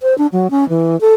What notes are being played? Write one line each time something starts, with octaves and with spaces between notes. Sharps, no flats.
C5
D4
F#3
C#4
E3
A4